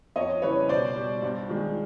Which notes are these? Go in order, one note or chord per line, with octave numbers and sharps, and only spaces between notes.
F2 C#5 D#5
C#3 E3 G3 B4 C#5
B2 C5 D5
G3
G2
D#3 G#3